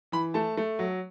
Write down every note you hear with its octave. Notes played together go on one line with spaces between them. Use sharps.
E3 B5
A3 A5
A3
F#3